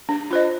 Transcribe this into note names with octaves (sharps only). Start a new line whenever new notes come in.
D4
F4 C5 D#5